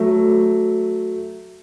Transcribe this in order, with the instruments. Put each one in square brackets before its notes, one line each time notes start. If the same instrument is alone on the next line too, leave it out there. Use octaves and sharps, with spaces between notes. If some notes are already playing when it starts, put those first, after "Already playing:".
Already playing: [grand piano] F#3 A3